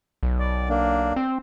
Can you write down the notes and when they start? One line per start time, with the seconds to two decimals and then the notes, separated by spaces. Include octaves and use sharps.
0.23 B1
0.39 D5
0.69 A#3 D4
1.16 C4